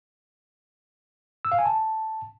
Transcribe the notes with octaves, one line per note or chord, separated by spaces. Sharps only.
E6
F5
G#5
A5